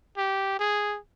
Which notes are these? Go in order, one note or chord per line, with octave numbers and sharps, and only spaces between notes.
G4
G#4